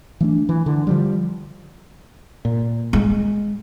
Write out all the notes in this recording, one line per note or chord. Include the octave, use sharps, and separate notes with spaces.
E3 A3 D4
E3
D3
D3 F3 G3
A#2
G#3